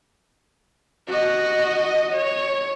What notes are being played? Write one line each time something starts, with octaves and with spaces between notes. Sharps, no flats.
F#4 D#5
C#5